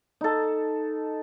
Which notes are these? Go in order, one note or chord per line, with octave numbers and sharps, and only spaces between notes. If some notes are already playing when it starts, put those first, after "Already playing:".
D#4 A4